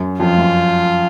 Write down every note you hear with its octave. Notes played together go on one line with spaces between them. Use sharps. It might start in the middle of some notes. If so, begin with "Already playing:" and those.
Already playing: F#2
F2 F4
F#2